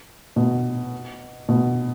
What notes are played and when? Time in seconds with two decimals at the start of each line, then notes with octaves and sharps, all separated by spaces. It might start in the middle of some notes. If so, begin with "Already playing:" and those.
0.36 B2
1.49 B2